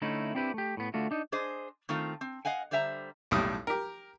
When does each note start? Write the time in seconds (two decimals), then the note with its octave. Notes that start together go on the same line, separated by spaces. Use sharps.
0.02 D3 A3 C#4 D#4 E4
0.35 C4 D4 E4 G4 B4
0.54 A3 G4
0.77 A2 B3
0.94 D3 A3 F4 F#4
1.11 D4 D#4
1.32 D4 G#4 C5 D#5
1.89 D#3 A3 C4 F4
2.21 C4
2.45 D#5 F5 F#5 G#5
2.71 D3 G3 C5 E5 G5 A#5
3.31 B1 A2 G3 D#6
3.67 G4 A#4